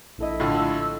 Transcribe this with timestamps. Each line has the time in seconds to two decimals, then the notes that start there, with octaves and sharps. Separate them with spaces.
0.18 A#1 E4 A4 D#5
0.40 A2 D3 F4
0.54 E6